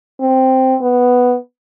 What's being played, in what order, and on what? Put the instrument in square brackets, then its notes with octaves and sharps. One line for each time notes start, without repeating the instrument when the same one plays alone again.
[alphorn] C4
B3